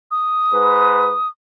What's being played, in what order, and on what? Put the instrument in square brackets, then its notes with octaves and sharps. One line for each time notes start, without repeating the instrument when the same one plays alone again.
[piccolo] D#6
[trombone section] G#2 B4